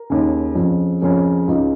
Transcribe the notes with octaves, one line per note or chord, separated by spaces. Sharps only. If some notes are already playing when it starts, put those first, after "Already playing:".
Already playing: A#4
D#2 C#3
F2 C#3
F2 C#3 A#4 C#5
C#2 C#3 D#4